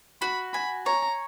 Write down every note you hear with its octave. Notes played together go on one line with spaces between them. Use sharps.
F#4 B5
G#5 B5
C#5 A#5